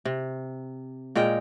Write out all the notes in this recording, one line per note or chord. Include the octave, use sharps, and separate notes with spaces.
C3
A#2 G#3 A#4 G5